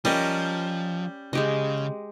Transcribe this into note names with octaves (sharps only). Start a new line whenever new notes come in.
F3 G3 C#4 A#4 D#5
C#3 G#3 G4 D#5